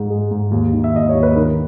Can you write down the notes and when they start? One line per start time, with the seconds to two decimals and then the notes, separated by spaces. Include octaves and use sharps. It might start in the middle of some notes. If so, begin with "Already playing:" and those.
Already playing: G#2 G#3
0.10 G#3
0.31 G#2
0.51 D#2
0.73 D#3
0.84 E5
0.94 D#2 D#5
1.09 C#5
1.15 D#2
1.23 B4
1.35 D#3 A#4